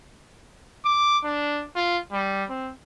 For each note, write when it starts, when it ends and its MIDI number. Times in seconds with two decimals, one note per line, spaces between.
0.85 1.18 86
1.24 1.65 62
1.75 2.00 65
2.12 2.44 55
2.50 2.71 60